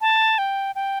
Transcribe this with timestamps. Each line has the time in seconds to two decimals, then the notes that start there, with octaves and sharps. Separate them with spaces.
0.01 A5
0.38 G5
0.75 G5